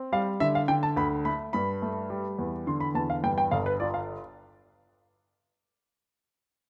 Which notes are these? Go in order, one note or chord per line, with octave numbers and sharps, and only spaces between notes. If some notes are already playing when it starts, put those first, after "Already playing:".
Already playing: C4
G3 F5
D3 E5
F5
D3 G5
A5
D2 B5
A3 B5
G2 B5
A3
G3
E2
D3 C6
B5
E2 A5
F5
G2 G5
G5
G1 F5
B4
F4 D5
F5